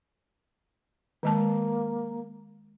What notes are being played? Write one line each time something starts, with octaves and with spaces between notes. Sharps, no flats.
D#3 G#3 A#3 A5